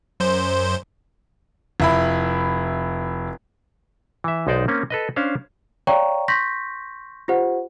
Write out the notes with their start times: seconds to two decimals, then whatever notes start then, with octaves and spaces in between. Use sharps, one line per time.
0.20 F#2 C5
1.80 F1 E4 B5
4.24 E3 E5
4.47 B1 G#3 D#4 C5 D5
4.68 A#3 C4 C#4
4.90 A4 B4 D#5
5.16 C#4 D4 C5 F5
5.87 C#5 D5 F5 G5 A#5 C#6
6.28 C6 C#6 G6 A#6 B6
7.28 F4 G4 C5 F#5